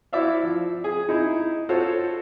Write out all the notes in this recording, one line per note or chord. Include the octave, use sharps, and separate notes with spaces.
E4 F#4 C5 D5 E5 F5
F3
G#4
D#4 E4
F4 F#4 A4 C5 C#5